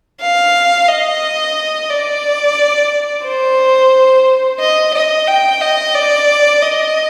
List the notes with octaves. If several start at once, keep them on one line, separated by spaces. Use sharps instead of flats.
F5
D#5
D5
C5
D#5
D#5
G5
D#5
D5
D#5